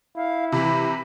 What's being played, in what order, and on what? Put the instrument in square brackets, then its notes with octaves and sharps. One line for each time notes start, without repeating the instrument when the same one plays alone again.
[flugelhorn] E4 [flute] F5
[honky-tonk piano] C3 E3 [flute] B5